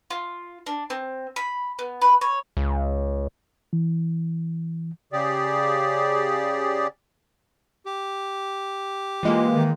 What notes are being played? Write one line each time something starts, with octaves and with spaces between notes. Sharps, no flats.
F4
D4
C4
B5
B3
B4
C#5
C#2
E3
C#3 G4 G#4 D5
G4
E3 G#3 A#3 F4
D#3